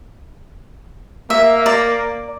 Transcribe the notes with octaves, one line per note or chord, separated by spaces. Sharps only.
A#3 E5
D5 A#5